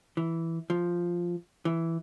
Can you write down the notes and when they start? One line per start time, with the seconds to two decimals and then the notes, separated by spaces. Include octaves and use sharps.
0.17 E3
0.70 F3
1.65 E3